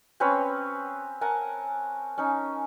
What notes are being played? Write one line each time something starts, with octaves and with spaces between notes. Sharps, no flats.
C4 C#4 B4 C#5
A#4 F#5 G#5 A5
C#4 D#4